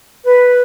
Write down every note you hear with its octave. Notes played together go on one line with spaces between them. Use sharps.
B4